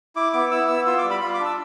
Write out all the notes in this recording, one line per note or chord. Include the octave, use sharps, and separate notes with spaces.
E4 D6
B3 D6
E4 E6
B3 E6
F4 E6
D6
G3
B5
F4 B5
D6
D4
E6